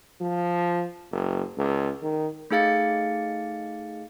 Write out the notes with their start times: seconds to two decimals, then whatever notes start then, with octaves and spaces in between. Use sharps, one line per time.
0.21 F3
1.12 F#1
1.58 C#2
2.02 D#3
2.51 A3 D#4 G#4 F5 A6 C#7